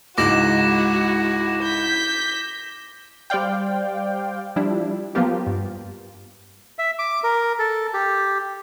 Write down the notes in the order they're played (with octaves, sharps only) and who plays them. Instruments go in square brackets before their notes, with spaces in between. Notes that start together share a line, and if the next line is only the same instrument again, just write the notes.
[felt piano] C#2 G#2 [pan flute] E4 [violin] F#4 [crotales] D6 A#6 E7
[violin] G6 B6
[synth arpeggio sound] G3 C5 D5 F5 G5
F3 G3 D4 E4
F3 F#3 A#3 B3 F4 G4
G2
[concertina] E5
D6
A#4
A4
G4